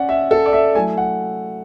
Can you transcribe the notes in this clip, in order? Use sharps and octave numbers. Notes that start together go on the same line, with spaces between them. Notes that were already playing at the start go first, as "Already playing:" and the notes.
Already playing: C#4 D5 F#5
E5
A4
D5
E5
F#3 A3 E4 G#5
F#5